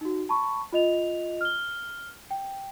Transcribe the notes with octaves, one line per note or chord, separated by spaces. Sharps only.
D#4 F#4
A5 B5 C#6
F4 D#5 F7
F6 G7
G5